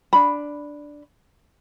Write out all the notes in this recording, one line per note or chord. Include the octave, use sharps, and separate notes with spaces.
D4 B5